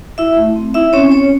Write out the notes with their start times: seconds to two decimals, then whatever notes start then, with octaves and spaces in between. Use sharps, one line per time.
0.18 E4 F#4 E5
0.37 A3
0.56 C4
0.74 D#4 E4 E5
0.93 C4 C#4 C#5
1.12 C#4 F#4 C#5